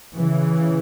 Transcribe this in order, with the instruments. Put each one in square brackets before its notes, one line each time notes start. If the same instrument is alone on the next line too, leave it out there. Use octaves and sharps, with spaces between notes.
[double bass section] C#3 E3